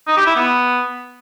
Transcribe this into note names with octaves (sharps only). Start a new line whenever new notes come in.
D#4
G4
E4
B3